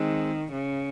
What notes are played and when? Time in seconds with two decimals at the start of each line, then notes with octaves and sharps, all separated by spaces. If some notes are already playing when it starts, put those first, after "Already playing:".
Already playing: D#3 G#3 C4
0.52 C#3